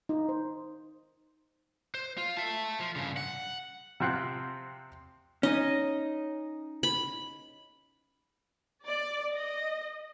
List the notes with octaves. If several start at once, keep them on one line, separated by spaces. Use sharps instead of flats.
D#4
C5
C5
F4
E5 A5
F3
G2 C#3
F#5
C3 F3 C4 F#5 F#6
C#4 D#4 D#5
B5
D5
D#5